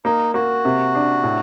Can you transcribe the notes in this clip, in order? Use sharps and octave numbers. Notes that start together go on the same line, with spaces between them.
A#3 D#4
A#3 F#4
C3
D4
A2